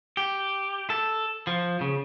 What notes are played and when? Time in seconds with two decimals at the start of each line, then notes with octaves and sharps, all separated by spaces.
0.17 G4
0.90 A4
1.47 F3
1.81 C#3